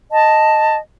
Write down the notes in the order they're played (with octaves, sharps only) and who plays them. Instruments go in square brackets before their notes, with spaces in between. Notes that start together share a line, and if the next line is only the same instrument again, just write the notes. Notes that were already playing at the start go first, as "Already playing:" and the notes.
[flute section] D#5 A5